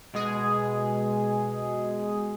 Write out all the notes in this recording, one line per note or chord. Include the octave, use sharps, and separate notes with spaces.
B2 G#3 G#4